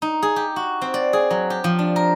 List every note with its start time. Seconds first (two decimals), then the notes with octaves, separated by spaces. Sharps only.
0.02 D#4
0.22 G#4
0.36 G4
0.56 F#4
0.82 C4
0.94 D5
1.13 G#4
1.31 F#3
1.50 G4
1.64 F3
1.79 D4
1.96 A#4